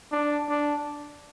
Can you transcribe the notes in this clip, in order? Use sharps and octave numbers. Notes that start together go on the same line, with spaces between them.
D4
D4